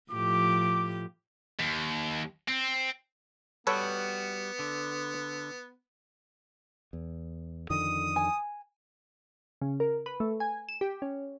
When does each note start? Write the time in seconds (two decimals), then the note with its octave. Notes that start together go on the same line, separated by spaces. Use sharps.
0.11 A2 F3 G4 D6
1.59 D#2
2.48 C4
3.67 G3 B3 F#4 A4 B4 C#5
4.59 D3
6.93 E2
7.70 F2 D3 D#3 D#6
8.16 G#5
9.61 C#3
9.80 A#4
10.06 B4
10.20 A3
10.40 G#5
10.69 E7
10.81 G4
11.02 C#4